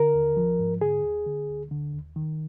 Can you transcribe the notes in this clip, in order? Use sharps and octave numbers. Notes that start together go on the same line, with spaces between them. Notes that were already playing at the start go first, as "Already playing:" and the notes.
Already playing: D3 A#4
D#2
F3
G#2
D3 G#4
D#2
D3
D2
D3
D#2
D#3